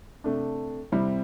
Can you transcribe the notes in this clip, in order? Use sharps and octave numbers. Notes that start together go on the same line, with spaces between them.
C3 A3 D4
C3 G3 C4 E4